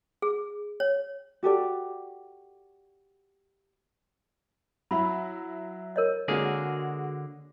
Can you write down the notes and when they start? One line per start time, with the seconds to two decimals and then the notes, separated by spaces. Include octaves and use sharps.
0.22 G#4
0.80 C#5
1.43 F#4 G4 A4 D5
4.91 F#3 E4 B5
5.96 A#4 C#5 D#5
6.28 D3 G#3 A#3 F#4 G#4